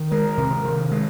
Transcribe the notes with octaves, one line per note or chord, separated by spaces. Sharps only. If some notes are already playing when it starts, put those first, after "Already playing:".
Already playing: D#3
G#3 A#4
C3
D#3
G#3